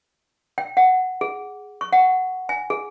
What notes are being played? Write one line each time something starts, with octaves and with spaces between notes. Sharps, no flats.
G5
F#5
G#4
C#6
F#5
G#5
G#4